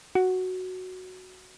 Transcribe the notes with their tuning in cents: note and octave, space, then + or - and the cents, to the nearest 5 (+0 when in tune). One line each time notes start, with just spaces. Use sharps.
F#4 +0